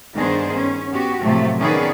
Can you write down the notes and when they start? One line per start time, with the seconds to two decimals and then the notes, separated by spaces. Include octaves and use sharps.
0.14 G2 D#3 B3 D4 G#4 C5
0.57 C#4
0.92 B3 F#4 G4
1.21 A2 C3 F3 F#3 A3
1.59 D#3 B3 C#4 G#4 B4 D5